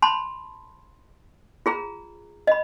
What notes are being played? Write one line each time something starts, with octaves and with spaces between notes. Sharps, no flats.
A5 B5 C6
F4 G#4 A#5
D#5 B5